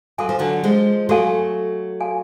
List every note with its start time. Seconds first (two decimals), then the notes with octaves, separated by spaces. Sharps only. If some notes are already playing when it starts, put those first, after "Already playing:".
0.18 F#3 F#4 A4 F5 G#5
0.29 F3
0.39 D3 F#3
0.64 F3 G#3
1.09 F#3 A3 F#4 A4 F5 G#5
2.01 F#4 A4 F5 G#5